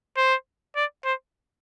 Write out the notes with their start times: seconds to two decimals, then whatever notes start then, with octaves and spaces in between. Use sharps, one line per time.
0.17 C5
0.76 D5
1.05 C5